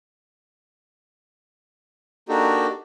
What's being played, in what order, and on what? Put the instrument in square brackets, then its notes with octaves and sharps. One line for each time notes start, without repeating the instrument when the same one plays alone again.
[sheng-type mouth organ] A#3 D4 D#4 F#4 G4 A4